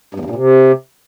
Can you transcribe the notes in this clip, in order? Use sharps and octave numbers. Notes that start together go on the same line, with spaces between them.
G2
E2
G2
A#2
C3